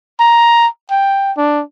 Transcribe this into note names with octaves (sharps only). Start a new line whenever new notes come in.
A#5
G5
D4